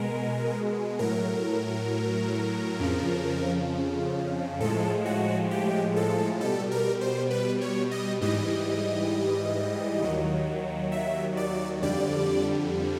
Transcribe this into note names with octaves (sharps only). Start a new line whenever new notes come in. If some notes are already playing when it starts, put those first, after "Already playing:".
Already playing: B2 G#3 A#4
A2 F#3 A#4
F2 C#3 F3
A2 F3 G#3 A4
F#4
G4
A4
B2 G3 A4
A#4
C5
B4
C#5
D#5
G#2 E3 G3 D#5
D#2 D#3 F#3
E5
D5
F2 D3 G3 D5